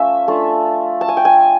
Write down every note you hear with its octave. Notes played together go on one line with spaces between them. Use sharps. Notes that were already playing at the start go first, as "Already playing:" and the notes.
Already playing: F3 A3 C#4 F4 E5
A3 D4 F4
A5
G#5
G5
G#5